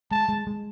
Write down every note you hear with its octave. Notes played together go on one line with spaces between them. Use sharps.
G#3 A5
G#3
G#3